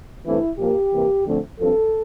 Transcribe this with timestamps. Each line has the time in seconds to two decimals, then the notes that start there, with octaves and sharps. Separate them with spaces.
0.25 G2 E3 A3 C4 E4
0.58 A#2 F3 A#3 G4
0.93 C3 E3 A#3
1.26 D2 D3 F3 A3 C4
1.59 G2 F3 C4 A4